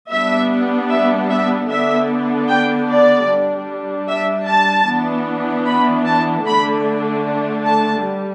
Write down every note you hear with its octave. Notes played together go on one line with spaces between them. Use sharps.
G3 B3 D4 E5
E5
E5
D3 B3 D4 E5
G5
D5
G3 D4
E5
A5
E3 B3 D4
B5
A5
D3 A3 D4 B5
A5
G3